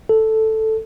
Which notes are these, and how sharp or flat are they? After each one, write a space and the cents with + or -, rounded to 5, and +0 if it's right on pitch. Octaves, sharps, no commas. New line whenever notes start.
A4 +0